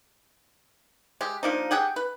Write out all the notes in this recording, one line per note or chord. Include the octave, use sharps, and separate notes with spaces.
G#3 G4
F3 A#3 D4 D#4
G4 G#4 F#5 G5
B4